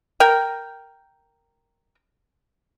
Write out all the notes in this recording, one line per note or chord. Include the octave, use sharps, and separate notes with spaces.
A#4 G5